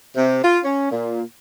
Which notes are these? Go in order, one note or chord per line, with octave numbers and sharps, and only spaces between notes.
C3
F4
C#4
A#2